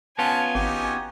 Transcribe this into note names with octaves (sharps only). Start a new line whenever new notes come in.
B3 C#4 F4 G#5 A5
G#1 D#4 F#4 G4